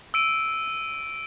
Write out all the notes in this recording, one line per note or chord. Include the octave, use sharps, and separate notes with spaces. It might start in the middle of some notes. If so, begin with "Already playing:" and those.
E6 D7 D#7